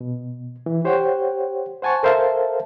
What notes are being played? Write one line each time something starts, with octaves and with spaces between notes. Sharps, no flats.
B2
E3
G4 C5 C#5 F#5 G5
C5 F#5 G#5 A5 C#6
A4 A#4 C5 E5 F5 A5